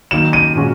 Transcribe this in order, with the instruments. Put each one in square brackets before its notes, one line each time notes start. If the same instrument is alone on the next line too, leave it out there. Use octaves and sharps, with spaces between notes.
[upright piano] D#3 F#3 A#3 [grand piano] E7
[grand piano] D#7
[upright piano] A#2 G#3 C#4 F#4